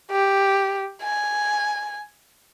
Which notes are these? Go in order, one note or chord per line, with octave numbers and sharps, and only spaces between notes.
G4
G#5